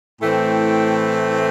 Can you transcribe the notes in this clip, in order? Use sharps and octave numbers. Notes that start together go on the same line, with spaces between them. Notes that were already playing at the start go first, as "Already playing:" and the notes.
A2 E3 A3 C4 G5